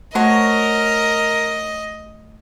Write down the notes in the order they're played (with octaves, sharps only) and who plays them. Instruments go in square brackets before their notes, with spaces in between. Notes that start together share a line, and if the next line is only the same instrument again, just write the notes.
[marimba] A3 [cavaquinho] F#4 C5 C#5 [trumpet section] A#4 [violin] D#5